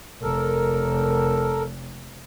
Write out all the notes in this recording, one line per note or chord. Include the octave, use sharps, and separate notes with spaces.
F1 A4 A#4